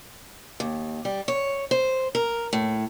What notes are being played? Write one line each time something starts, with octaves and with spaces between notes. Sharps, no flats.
D#2
G3
C#5
C5
A#4
A2